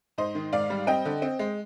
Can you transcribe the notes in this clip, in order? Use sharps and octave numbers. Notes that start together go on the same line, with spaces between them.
G#2 C5 D#5
D#3
G#2 D5 F5
G3
C4 D#5 G5
D3
C4
G#3